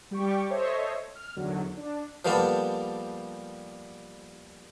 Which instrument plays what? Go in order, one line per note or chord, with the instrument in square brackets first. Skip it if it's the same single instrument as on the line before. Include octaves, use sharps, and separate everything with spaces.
[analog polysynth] G3 G4 G5 C#6 D6
A4 C5 C#5 D#5 E5
F6
E2 D3 D#3 F#3
D4
[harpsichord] F3 G3 A#3 B3 A4